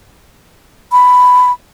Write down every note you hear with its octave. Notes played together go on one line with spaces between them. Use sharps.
B5